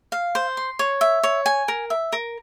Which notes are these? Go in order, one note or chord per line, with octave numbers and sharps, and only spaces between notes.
F5
C5
C6
C#5
E5
C#5
G#5
A#4
E5
A#4